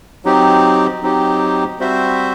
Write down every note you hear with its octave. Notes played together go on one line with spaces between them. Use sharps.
F#3 C4 D#4 G4
F#3 C4 D#4 G4
G3 C4 F#4 C5 E5